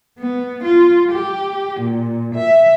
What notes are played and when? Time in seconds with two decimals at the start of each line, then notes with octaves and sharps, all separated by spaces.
0.19 B3
0.64 F4
1.12 G4
1.80 A#2
2.35 E5